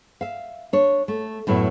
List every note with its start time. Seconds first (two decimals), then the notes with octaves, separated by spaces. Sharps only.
0.21 E5 F5
0.73 D4 C#5
1.08 A3
1.47 F#2 A2 F#3 B3 E4